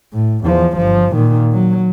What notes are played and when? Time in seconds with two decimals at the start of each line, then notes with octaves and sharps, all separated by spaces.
0.13 A2
0.45 E2 F3
0.77 G1 F3
1.13 A#2 D#3
1.52 F#3